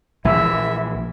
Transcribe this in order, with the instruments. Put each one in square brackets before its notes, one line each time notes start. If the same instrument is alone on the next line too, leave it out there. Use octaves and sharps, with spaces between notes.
[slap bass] A#1 E3 [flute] E5